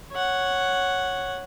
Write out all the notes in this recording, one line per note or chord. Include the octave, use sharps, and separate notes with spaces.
C#5 F#5